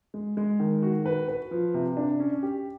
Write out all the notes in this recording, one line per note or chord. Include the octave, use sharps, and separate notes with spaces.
G#3
G#3
D#3
F#4
B4
B4
F3
C3
D4
C#4
G4